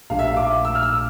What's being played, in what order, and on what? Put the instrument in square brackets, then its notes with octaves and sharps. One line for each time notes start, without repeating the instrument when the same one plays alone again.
[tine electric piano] A#1 A#2 A3 D4 G4 [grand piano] F5
[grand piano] E5
F5
D6
E6
F6
E6